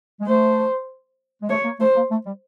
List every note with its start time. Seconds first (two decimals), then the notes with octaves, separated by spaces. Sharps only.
0.20 G#3
0.27 A3 C5
1.42 G#3
1.49 A3 C#5
1.65 A#3
1.80 A3 C5
1.96 A#3
2.11 A3
2.26 G3